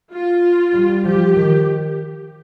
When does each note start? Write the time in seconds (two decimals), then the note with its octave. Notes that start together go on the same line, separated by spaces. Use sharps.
0.12 F4
0.74 G3
1.04 F3 G4
1.35 D#3